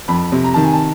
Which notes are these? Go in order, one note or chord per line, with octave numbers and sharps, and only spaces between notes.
F2 B5
C3
A#5
D#3 A5
G#5
A5